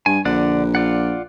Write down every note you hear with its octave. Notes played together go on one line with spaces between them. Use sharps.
G2 G#5
A#1 D3 D5 F#5
F4 D5 F#5